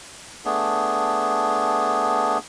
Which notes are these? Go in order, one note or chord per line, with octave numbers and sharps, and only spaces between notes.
A3 B3 D4 G#4